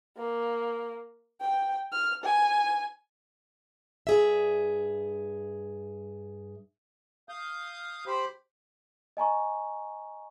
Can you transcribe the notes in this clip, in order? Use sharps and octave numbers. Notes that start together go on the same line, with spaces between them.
A#3
G5
F6
G#5
G2 G#4 E5
F5 D#6 G6
G4 C5 B5
D#5 G#5 A#5 C#6